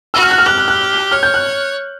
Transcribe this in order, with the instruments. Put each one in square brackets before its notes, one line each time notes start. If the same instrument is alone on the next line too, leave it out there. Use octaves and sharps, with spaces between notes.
[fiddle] F#4 [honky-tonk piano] E6
[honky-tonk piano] F6
F#6
F6
[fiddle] G4 [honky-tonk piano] F#6
[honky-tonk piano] F#6
F#6
[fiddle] C#5 [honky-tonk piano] F6
[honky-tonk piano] G6
F#6